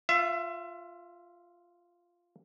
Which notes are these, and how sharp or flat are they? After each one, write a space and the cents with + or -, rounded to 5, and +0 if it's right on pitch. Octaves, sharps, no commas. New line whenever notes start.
F4 +0 E5 +25